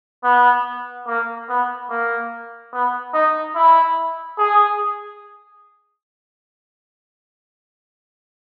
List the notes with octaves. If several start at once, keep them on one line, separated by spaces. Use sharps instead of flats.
B3
A#3
B3
A#3
B3
D#4
E4
G#4